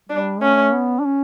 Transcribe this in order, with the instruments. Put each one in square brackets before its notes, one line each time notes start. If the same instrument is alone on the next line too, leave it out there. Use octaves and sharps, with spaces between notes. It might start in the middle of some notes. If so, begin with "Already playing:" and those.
[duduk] G3 [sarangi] D4
[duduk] A3 [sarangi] C#4
[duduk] B3
D4
C#4